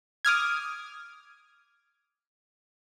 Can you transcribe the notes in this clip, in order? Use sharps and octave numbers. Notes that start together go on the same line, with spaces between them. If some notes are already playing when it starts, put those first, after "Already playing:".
D6 D#6 F6 G#6